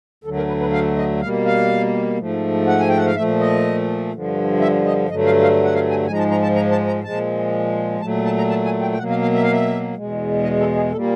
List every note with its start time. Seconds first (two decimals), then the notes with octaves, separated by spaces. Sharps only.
0.24 D2 D3 F#3 A3 A4
0.36 A#4
0.48 B4
0.60 B4
0.72 F5
0.97 D#5
1.21 B2 G3 A#3 F5
1.45 F5
2.18 G#2 F3 A3
2.67 F#5
2.80 G#5
2.89 G5
2.97 F#5
3.06 F5
3.15 A#2 F3 A3 E5
3.40 D#5
4.13 G2 D3 F3
4.60 E5
4.86 D#5
5.09 G2 D3 F#3 A3 D#5
5.26 F5
5.42 F5
5.64 F#5
5.75 F5
5.90 G#5
6.06 G#2 F3 G#3 G#5
6.13 A#5
6.19 A5
6.31 A#5
6.43 A5
6.56 A#5
6.71 A5
6.87 A#5
7.04 A#2 F3 G#3 A5
8.01 A#2 F#3 A3 A5
8.25 A5
8.37 A#5
8.50 A5
8.65 G#5
8.81 G5
8.92 G5
8.98 B2 F#3 A#3 F#5
9.10 F5
9.22 F5
9.34 E5
9.43 F5
9.52 E5
9.95 E2 B2 G#3
10.43 D#5
10.60 A4
10.76 G#4
10.92 A#2 G3 A#3 A4